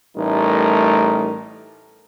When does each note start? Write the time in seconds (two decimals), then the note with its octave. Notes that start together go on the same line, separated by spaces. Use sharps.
0.16 A1 G3 A3 D#4 A#4